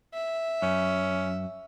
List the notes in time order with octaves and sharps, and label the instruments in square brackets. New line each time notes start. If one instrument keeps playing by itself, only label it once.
[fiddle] E5
[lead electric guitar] F#2 [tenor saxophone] C#4